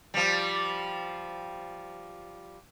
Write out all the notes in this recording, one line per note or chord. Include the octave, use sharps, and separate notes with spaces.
F3 G3